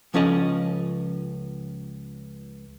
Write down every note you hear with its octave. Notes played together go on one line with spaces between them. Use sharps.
C#2 F3 C#4 A4 D#5